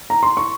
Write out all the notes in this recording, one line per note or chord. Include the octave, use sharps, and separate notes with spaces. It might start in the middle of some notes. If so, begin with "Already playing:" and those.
A#5
C6
C#6